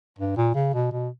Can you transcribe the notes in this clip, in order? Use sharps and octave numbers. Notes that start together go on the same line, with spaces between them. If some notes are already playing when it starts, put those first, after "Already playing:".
G2
A#2
C#3
B2
B2